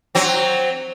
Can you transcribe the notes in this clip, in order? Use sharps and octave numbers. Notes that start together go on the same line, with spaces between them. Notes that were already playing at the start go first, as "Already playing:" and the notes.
F#3 C4